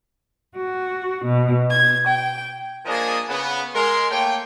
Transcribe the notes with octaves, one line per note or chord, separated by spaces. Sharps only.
F#4
B2
G#6
G5
F3 A#3 D4 G#4 A#4 D#5
C#3 B3
G#3 A#4 C6
A3 A#3 C#5 G5